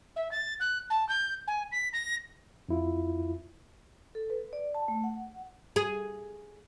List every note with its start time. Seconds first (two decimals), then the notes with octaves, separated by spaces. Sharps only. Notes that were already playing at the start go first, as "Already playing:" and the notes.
0.16 E5
0.31 A6
0.60 F#6
0.90 A5
1.09 G6
1.47 G#5
1.72 B6
1.93 A#6
2.69 F2 E4 F4
4.15 A4
4.30 B4
4.53 D5
4.75 A5
4.88 A3
5.04 F#5
5.76 G#4